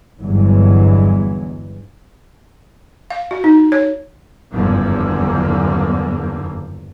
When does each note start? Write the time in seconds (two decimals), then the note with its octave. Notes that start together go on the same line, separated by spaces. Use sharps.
0.20 G1 E2 G2 E3 F#3 G#3
3.10 F5
3.31 F#4
3.44 D#4
3.72 C#5
4.53 F#1 E2 G2 D3 F3 A#3